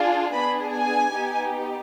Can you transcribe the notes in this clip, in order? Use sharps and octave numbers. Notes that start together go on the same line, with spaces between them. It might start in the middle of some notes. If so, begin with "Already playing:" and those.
Already playing: D4 F4 G#4
B3 D4 G#4 B5
G#5
B3 D#4 G4